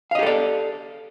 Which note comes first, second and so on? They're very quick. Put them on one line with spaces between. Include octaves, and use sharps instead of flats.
F5 D#5 G4 A4 D5